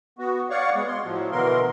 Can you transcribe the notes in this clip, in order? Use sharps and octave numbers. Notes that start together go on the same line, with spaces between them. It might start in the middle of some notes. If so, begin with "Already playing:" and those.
B3 F#4
C#5 D5 F5 F#5 C#6
G#3 B3
C6
A2 F3 F#3
B2 D3 E3 B3 A#4 C6